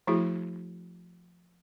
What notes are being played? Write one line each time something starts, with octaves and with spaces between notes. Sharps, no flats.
F3 A3 E4 F#4 G#4